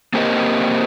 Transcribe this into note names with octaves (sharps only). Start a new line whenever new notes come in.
A#3 C4 G4 A#4 C5 D#5